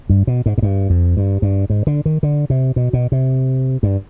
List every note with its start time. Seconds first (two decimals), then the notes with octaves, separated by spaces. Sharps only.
0.09 G2
0.27 B2
0.46 G#2
0.58 G#2
0.62 G2
0.90 F2
1.17 G2
1.42 G2
1.70 G#2
1.87 D3
2.06 D#3
2.23 D3
2.50 C3
2.76 B2
2.93 B2
3.12 C3
3.83 G2